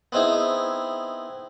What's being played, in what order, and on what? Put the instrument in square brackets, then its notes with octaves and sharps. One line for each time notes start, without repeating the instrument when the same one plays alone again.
[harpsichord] B3 C4 D#4 E4 G#4